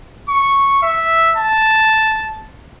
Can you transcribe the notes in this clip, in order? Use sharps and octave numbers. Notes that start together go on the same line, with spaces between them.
C#6
E5
A5